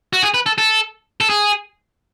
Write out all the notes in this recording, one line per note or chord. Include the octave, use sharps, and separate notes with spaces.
F#4
G#4
B4
A4
A4
A4
G#4